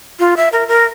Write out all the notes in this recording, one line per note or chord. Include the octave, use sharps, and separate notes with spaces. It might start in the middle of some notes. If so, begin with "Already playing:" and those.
F4
E5
A#4
A#4